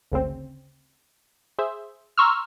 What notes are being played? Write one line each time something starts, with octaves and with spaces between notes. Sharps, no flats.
G#1 D2 C#3 C4
G#4 C5 E5
A#5 C6 C#6 E6 F6